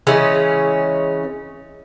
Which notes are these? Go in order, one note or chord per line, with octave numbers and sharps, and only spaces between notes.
C#3 E3 G#3 C#4